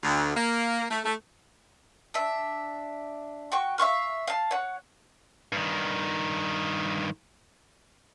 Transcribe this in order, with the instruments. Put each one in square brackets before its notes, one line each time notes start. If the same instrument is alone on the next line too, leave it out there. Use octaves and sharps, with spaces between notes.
[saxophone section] D2
A#3
A3
A3
[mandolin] D4 E5
F#4 G5 C#6
E5 F5 C#6 F6
F5 A5
C#5 F#5
[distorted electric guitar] G2 D#3